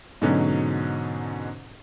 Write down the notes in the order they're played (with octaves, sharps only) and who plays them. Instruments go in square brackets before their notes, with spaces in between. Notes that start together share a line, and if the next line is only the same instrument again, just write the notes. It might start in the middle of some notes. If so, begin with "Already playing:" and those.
[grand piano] G#2 B2 D3 F#3 C#4 D#4